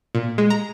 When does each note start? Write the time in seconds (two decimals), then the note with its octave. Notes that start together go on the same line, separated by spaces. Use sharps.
0.15 A#2
0.38 G#3
0.50 A#5